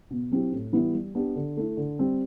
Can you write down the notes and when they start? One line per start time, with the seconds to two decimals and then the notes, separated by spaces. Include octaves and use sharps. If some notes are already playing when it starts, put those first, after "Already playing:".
0.11 B2
0.32 F#3 C4 E4 G4
0.52 A2
0.72 E3 G3 B3 E4
0.94 G3
1.15 B3 D4 G4
1.35 D3
1.57 A3 E4
1.77 D3
1.99 G3 C4